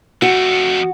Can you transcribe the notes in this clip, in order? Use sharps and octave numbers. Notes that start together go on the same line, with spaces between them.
F2 A3 F#4